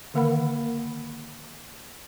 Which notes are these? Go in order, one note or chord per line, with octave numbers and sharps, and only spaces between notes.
D3 D#3 A#3 A#4 F#5 B5